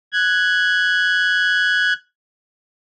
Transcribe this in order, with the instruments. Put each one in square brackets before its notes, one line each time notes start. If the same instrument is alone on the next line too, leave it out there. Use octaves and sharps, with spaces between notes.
[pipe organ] F#6 G#6